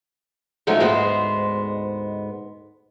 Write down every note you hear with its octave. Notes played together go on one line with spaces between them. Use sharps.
C#3 F3 F#3 G#3 A3 D#4
D2 G#2 G#3 B3 C5